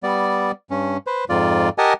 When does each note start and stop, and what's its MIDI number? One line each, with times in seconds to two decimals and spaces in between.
0.03 0.51 55
0.03 0.51 59
0.03 0.51 74
0.71 0.97 43
0.71 0.97 61
1.07 1.25 71
1.07 1.25 72
1.29 1.69 41
1.29 1.69 44
1.29 1.69 65
1.29 1.69 74
1.78 1.93 67
1.78 1.93 70
1.78 1.93 75
1.78 1.93 78
1.78 1.93 80
1.78 1.93 81